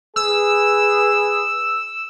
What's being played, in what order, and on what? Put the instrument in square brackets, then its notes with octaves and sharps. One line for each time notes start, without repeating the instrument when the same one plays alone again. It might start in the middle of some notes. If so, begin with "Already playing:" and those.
[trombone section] G#4 B4 [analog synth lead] E6